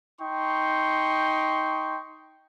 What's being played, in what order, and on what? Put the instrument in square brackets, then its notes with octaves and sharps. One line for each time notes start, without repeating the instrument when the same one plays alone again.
[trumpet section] D#4 G5 C6 C#6